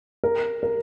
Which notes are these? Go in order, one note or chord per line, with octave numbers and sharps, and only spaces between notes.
A#4
A#4